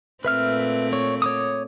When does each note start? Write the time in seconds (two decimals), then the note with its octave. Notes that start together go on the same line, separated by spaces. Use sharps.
0.25 A#2 A3 C4 B4 E5 F6
0.93 C#5
1.22 C#5 D6 D#6